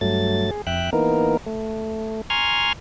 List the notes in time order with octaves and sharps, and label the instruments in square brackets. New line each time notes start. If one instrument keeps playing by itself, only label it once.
[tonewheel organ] G2 F#3 A3 A6
G#4
F2 E5 G5 F#6
E3 A#3 B3 D#4 A#4
A3
G#5 A#5 C6 C#6 F6 G#6